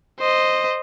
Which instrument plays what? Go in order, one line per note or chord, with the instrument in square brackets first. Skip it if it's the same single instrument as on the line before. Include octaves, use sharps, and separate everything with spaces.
[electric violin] C5 D#5